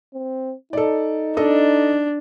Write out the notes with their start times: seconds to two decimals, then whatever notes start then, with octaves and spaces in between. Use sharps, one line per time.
0.14 C4
0.73 D#4 A4 D5
1.37 D4 A4 D#5